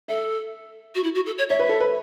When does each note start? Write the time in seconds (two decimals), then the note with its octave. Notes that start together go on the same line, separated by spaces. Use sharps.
0.08 A4 E5
0.95 F#4
1.03 E4
1.15 F#4
1.26 A4
1.38 C#5
1.49 C#5 E5
1.59 B4
1.69 A4
1.80 B4